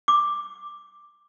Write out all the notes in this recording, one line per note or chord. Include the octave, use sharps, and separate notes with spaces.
D6